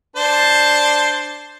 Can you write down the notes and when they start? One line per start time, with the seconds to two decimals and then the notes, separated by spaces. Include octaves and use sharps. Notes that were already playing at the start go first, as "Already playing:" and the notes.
0.16 D4 C5 A5